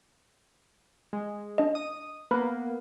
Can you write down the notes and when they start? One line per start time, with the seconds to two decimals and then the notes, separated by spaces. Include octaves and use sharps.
1.13 G#3
1.58 D4 D#5
1.75 D#6
2.31 A#3 B3 B4 B5